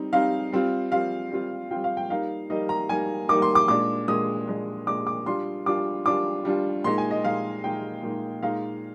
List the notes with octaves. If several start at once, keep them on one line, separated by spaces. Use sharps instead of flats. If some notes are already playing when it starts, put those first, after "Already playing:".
Already playing: G3 C4 D#4
G3 C4 D#4 F5
G3 C4 F4
G3 C4 F4 F5
G3 C4 F4
G3 C4 F4 G5
F5
G5
G3 A#3 D#4 F5
G3 A#3 D#4 D#5
A#5
G3 A#3 D#4 G#5
G3 A#3 D#4 D6
C6
D6
A#2 G#3 D4 D6
A#2 G#3 D4 D#6
A#2 G#3 D4
A#2 G#3 D4 D6
D6
G3 D4 F4 C6
G3 D4 F4 D6
G3 D4 F4 D6
G3 D4 F4
A#2 G#3 D#4 C6
G#5
D#5
A#2 G#3 D#4 F5
A#2 G#3 D#4 G5
A#2 G#3 D#4
A#2 G#3 D#4 F5